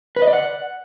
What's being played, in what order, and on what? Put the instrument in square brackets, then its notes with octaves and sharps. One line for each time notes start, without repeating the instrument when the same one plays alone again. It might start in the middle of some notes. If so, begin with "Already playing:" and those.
[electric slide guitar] B4
D#5
D5
F#5